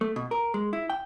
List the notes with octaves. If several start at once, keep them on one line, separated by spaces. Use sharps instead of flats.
A3
B2
A#4
G#3
E4
G5